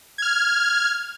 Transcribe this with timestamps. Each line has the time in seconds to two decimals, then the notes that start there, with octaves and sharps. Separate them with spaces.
0.18 F6 G#6